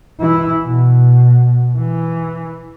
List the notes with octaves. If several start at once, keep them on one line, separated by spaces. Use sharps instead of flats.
E3 E4
B2
E3